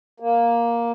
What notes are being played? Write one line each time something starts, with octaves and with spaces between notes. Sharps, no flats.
A#3